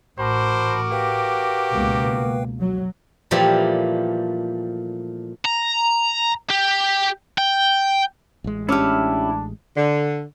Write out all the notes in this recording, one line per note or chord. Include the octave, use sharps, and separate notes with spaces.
A1 F#4 A#4 C5 A5 B5 D6
G4 B4 F5 G5
C#2 B2 A#3
F#3
A#2 E3 F3 G3 A3 G4
A#5
G4
G5
A1 G#3
C#4 D4 E4 G4 D6 F6
D3